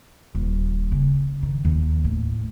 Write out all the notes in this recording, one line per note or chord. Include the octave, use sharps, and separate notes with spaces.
D#1
C#3
D#3
D#2
A2